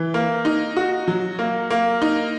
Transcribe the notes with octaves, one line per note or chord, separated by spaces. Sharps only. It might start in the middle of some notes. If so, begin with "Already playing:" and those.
Already playing: E3
A#3
D#4
F#4
F#3
A#3
A#3
D#4